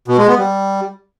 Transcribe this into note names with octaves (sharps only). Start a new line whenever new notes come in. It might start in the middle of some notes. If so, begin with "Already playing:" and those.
B2
G#3
B3
G3